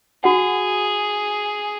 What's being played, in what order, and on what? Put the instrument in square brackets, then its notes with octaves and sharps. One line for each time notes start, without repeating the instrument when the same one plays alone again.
[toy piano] F#4 F#5 [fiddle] G#4